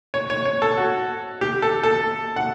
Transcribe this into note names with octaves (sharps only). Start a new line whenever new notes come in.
C#5
C#5
C#5
A4
F#4
G4
A4
A4
F#5